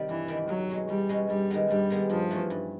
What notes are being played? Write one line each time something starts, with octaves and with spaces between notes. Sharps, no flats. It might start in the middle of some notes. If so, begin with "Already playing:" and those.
Already playing: C3 D#3 G3
G2 E3
D#3 G3
E2 F#3
B2 G#3 C#4
E2 G3
B2 G#3 C#4
G2 G3
D#3 G#3 B3
G2 G3
D#3 G#3 B3
G2 F3
E3 A3 C#4
G2